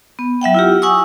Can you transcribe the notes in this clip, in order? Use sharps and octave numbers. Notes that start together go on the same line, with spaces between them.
B3
F#3 E5 F#5 G5
E4 F4 G4
F#5 G#5 C#6 D#6 E6